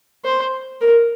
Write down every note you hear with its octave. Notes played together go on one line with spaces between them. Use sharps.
C5
A#4